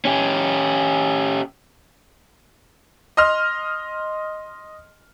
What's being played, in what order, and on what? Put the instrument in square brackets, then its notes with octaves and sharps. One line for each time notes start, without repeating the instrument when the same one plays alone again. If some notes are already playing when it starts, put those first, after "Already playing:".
[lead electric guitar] C#4 G4
[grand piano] D#5 C6 F6